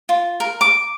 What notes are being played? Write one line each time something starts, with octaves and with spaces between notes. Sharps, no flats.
F4
A#4
D6